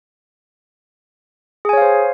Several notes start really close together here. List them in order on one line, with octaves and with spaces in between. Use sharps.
G#4 G#5 C#5 F5 C5